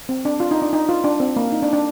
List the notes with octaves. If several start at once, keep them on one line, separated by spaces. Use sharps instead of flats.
C4
D4
F4
D#4
D4
D#4
F4
D4
C4
A#3
D#4
D4
D4